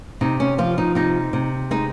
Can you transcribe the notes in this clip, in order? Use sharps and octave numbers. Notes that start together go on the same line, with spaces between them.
C3 D#4
C#4
F3 F4
D#4
C3 D#4
C3
G#3 D#4